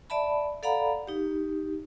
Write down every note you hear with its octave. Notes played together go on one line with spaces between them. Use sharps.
D5 E5 A5 B5
A4 D5 F5 F#5 A#5 B5
D#4 G4